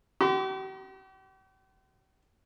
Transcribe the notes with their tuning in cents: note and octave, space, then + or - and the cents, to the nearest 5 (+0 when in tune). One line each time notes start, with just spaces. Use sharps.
G4 -45 C6 -35